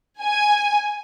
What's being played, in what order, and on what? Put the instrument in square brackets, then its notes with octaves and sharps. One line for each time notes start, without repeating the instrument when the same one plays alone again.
[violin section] G#5